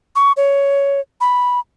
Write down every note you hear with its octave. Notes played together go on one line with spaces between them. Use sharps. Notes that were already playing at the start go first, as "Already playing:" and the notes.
C#6
C#5
B5